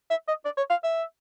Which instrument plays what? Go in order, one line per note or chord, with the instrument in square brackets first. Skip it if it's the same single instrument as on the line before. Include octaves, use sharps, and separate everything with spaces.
[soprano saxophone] E5
D#5
D5
C#5
F5
E5